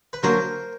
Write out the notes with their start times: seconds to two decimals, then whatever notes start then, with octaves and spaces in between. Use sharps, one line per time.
0.13 B4
0.23 D3 F#3 A#3 A#4 C5